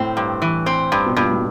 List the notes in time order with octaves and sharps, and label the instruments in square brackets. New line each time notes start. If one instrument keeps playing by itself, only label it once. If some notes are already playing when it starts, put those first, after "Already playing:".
Already playing: [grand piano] A2 [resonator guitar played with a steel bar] C4
[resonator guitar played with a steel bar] G2
E3
C4
G2
[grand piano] B2
[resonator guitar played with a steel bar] G2 [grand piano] A#2
[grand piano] A2